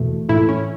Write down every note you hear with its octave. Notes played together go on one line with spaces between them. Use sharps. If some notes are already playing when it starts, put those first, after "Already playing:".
Already playing: E2 B2 A3
A2 E3 A3 E4
C#4